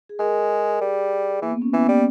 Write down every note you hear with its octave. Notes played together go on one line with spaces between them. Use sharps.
G#4
G#3 A#4
G3 G#4
E3 A#3
B3
C#4
E3 B3
G3 A#3